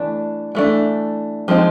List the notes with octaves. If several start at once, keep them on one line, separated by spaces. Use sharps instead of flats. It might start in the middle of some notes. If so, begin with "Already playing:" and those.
Already playing: E3 A3 D4
E3 A3 D4
F3 G#3 C4 D#4